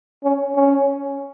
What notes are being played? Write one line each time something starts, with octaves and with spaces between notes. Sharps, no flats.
C#4
C#4